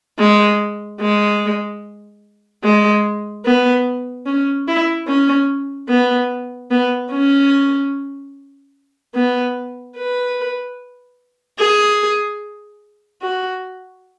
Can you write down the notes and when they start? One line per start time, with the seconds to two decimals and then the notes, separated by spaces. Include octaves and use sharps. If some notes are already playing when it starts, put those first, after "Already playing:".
0.20 G#3
1.01 G#3
2.64 G#3
3.45 B3
4.27 C#4
4.68 E4
5.08 C#4
5.89 B3
6.71 B3
7.12 C#4
9.15 B3
9.97 B4
11.59 G#4
13.22 F#4